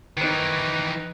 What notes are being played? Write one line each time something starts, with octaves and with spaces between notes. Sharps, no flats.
D#3 E3 D#4 B4